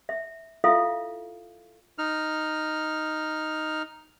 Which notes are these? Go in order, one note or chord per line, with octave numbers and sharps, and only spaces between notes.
E5
E4 F4 A4 E5 F5
D#4 F6